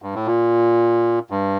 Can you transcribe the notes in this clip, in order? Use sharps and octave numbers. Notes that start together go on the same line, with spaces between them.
G2
A2
A#2
G2